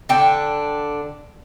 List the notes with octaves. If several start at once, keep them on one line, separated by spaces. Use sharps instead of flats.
D3 D4 G5